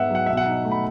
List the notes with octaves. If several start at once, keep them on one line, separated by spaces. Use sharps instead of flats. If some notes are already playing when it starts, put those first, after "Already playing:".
Already playing: G#2 B3 E5 F#5
F#3 F#5
B2 E5
F#5
D#4
A3
B5